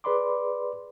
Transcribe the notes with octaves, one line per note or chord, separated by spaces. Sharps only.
G#4 B4 D5 B5 C6 D6